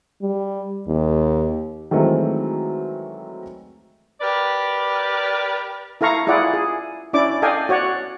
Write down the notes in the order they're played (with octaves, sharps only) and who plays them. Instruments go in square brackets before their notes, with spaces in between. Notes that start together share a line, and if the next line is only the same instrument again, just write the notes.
[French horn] G3
D#2
[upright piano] D#3 E3 F#3 G#3 A3 C4
[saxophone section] G4 A#4 B4 D5
[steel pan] E4 A4 F5 A#5 C#6
E4 F4 G#4 D5 F#5
G#4
C#4 D4 E4 D5 D6
A4 D5 D#5 F5 G5 G#5
F#4 C#5 D5 F#5